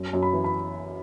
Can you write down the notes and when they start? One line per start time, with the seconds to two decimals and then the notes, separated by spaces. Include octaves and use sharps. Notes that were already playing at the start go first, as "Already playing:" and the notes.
Already playing: F#2
0.13 F#2
0.23 B5
0.33 E3
0.44 B5